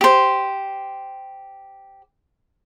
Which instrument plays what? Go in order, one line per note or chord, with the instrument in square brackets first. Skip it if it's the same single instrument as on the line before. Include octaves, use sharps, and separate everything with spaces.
[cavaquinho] G4 C5